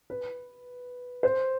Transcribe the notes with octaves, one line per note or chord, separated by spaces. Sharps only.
B4
C5